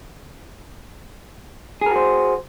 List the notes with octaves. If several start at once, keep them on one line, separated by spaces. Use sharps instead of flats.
F#4 G#4 A#4 C5